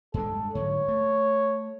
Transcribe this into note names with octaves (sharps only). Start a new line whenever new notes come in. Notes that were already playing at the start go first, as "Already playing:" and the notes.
G2 G#3 D4 A4
G#2 D3 F#3 C#5
A3